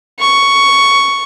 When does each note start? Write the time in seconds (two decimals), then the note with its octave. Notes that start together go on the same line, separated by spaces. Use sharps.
0.20 C#6